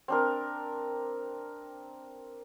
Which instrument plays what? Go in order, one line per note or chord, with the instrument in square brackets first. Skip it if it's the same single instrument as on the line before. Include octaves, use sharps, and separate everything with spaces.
[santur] C4 D4 A#4